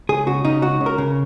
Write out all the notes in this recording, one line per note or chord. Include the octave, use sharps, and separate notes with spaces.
C#2 G#4
C#3 F#4
C#3 D#4
C#2 F#4
C#3
A#4
C#3